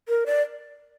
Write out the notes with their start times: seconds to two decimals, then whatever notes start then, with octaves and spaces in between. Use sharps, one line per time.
0.08 A#4
0.26 D5